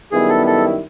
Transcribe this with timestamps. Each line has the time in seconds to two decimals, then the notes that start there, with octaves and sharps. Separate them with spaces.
0.12 F#2 D#3 G3 B3 E4 G#4
0.29 A4
0.47 A4